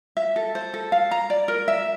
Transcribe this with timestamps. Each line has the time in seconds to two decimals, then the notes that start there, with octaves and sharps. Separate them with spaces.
0.17 E5
0.36 A4
0.55 C5
0.74 A4
0.92 F5
1.11 A#5
1.30 D5
1.48 A#4
1.68 E5